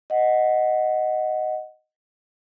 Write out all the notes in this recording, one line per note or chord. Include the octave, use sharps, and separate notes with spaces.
D#5 F#5